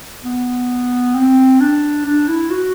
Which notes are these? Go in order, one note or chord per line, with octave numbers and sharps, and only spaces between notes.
B3
C4
D4
D4
E4
F#4